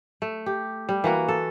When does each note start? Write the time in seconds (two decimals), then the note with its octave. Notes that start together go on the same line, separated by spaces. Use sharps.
0.22 A3
0.46 G4
0.89 G3
1.04 E3 A#3 F#4
1.28 A4